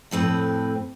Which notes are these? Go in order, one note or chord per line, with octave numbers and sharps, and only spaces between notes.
F2 A2 C4 B4